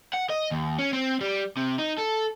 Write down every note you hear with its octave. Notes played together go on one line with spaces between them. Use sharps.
F#5
D#5
D#2
C#4
C4
G3
C3
D#4
A4